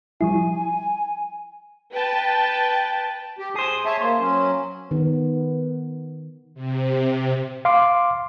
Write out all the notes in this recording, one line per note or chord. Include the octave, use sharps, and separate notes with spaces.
F3 G3 E4 G#5
B4 G5 A5
G4
G#4 C5 D#6
C#5 E5 A5
A#3 C5
F#3 C#4
D#3 B3
C3
F5 C6 D6